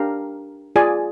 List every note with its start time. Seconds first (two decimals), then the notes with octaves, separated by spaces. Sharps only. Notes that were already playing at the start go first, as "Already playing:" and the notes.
Already playing: D4 G4 A#4 F5
0.76 F4 G#4 D5 G#5